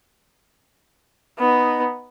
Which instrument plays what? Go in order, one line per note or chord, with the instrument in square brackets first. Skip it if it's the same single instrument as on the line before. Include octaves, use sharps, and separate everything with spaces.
[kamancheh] B3 D#4